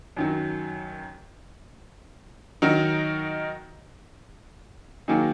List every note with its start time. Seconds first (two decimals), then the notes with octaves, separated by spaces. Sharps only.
0.17 F#2 D#3 F#3
2.62 D#3 F#3 D#4 F#4 A#4
5.08 D#3 F#3 A#3 D#4 G#4